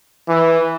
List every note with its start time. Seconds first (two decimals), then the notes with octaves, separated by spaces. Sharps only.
0.29 E3